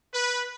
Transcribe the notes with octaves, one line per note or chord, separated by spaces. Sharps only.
B4